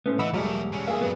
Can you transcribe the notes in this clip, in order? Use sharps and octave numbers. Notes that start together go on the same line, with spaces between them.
A2 A3 B3 C#4 C5
E3 D#5 F#5 B5 E6
E1 F#3 G3 A3 G#4 A#4
D3 C#4
A#2 A#3 G#4 E5 F5
F#2 F#3 G3 B3